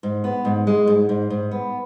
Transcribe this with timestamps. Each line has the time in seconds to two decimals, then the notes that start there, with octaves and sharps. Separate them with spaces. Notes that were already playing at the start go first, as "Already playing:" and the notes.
0.03 G#2
0.24 B3
0.45 G#2
0.67 G#3
0.87 G#2
1.09 G#2
1.30 G#2
1.51 B3